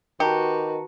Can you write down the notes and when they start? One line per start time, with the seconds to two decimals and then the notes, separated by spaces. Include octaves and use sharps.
0.20 D#3 F#4 G4 B4 A5 A#5 C#7